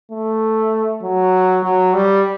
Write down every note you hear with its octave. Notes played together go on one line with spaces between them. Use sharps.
A3
F#3
F#3
G3